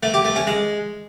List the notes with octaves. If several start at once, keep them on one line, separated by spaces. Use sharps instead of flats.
A3
G4
A3
C#4
G#3